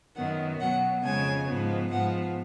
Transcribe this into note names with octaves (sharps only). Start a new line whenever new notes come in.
F#2 D#3 F#3 B3 F#5
B2 F#3 B3 F#5
F2 C#3 G#3 G#5
G#2 F3 B3
G#2 F3 B3 F#5